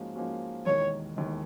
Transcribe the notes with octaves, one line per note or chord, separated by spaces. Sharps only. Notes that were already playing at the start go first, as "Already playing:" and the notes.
Already playing: G#2 F3 A#3 C#4 F#4
G#2 F3 A#3 C#4 F#4
E1 D#2 D#3 C#5
E1 D#2 D#3